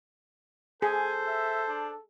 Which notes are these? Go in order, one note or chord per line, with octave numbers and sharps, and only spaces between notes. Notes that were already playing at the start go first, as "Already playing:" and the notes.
G#4 A4 C5 G#5
E5
D4